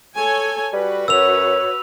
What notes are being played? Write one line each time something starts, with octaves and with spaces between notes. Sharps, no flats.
A4 C#5 G#5
G3 F#4 B4
F#2 C#5 E6 F7